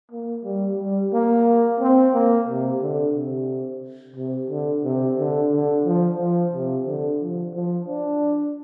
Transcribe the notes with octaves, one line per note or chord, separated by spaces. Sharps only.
A#3
G3
G3
A#3
C4
A#3
C3
D3
C3
C3
D3
C3
D3
D3
F3
F3
C3
D3
F3
F3
D4